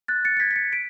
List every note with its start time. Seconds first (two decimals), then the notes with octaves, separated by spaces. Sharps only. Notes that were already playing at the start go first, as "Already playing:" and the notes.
0.08 F#6 A6
0.25 A6 C#7
0.37 A6
0.40 G#6 B6
0.51 B6
0.56 A6 C#7
0.73 B6 D7